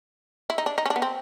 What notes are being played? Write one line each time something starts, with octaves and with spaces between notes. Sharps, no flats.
E4
D#4
D4
D#4
C#4
D4
B3
C4